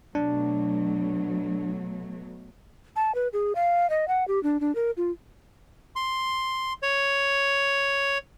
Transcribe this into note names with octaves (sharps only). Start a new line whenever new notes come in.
B2 F#3 A3 D4
A5
B4
G#4
F5
D#5
F#5
G4
D4
D4
A#4
F4
C6
C#5